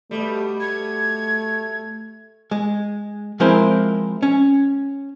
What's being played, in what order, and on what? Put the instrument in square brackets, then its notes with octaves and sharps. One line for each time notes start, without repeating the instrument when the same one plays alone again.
[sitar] B2 G3 [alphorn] A3
[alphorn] A3 [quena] G#6
[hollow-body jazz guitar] G#3
F3 G#3 C4 E4 A#4 C5
C#4